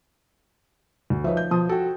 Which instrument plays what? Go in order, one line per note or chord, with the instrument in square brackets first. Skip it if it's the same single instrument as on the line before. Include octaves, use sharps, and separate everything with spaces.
[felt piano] D2
[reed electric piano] F3 D#4 [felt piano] B4 C#5 E5
[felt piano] G6
[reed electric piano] B2 F3 [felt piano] A5 D#6
[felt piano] F#4 G5 [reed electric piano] A4